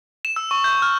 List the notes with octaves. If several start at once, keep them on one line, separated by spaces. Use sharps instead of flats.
E7
E6
C#6
G6
F6